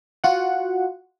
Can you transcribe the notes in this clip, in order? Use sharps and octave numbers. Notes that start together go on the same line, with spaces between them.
F4 F#4 F#5